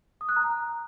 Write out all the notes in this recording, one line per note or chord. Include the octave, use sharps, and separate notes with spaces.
D#6
F#6
A#5